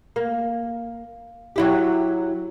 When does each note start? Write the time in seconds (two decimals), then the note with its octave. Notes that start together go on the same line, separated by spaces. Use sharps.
0.16 A#3
1.56 F#3 E4 G4